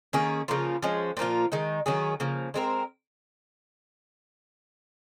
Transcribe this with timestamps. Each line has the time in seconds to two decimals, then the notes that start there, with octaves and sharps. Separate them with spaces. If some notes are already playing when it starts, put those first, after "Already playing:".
0.13 D#3 A#3 C#4 G#4
0.48 C#3 F3 A#3 F4
0.82 F3 G#3 C#4
1.17 A#2 F3 A#3 F4
1.52 D#3 G#3 D#4
1.86 D#3 F#3 C#4 G#4
2.20 C#3 F3 A#3
2.54 G#3 C4 F4 A#4